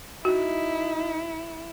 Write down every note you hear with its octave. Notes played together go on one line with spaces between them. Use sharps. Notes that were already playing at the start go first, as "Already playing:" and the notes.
D#4 E4 F#4